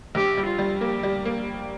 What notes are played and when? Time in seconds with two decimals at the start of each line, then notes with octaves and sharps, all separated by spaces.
0.15 A#1 G4
0.37 G3
0.47 F4
0.59 G3
0.81 A#3 G4
1.03 G3
1.25 A#3